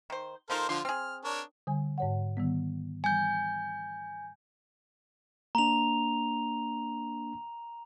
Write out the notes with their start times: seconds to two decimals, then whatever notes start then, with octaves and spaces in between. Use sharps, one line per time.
0.10 D#3 C5
0.50 F3 D#4 F4 A4 A#4 C5
0.69 D3 F3 F4 C6
0.85 C4 G#4 F6
1.24 D4 A#4 C#5
1.67 D3 G3 G#5
1.98 G#2 C#5 F#5
2.37 D#3 G3 B3
3.04 E3 G3 G#5 G6
5.55 A#3 D4 A#5 F7